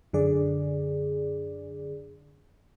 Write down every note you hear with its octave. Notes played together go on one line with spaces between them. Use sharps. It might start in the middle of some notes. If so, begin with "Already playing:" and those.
F#2 D3 G#4 D5